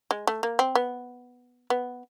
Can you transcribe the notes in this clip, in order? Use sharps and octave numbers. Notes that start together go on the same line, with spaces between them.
G#3
A3
A#3
C4
B3
B3